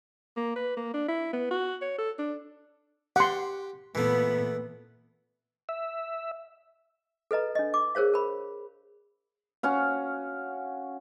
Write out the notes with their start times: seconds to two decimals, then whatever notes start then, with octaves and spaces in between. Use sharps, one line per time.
0.37 A#3
0.56 B4
0.77 A#3
0.94 D4
1.09 E4
1.33 B3
1.51 F#4
1.82 C#5
1.99 A4
2.19 D4
3.16 G4 F#5 C6 C#6
3.95 A#2 E3 A3 B3
5.69 E5
7.31 A4 B4 D#5 A#5
7.55 D4 D#5
7.74 D6
7.95 G#4 A#4 C5 C#5 F5
8.14 A#4 B5
9.63 C#4 F#4 F5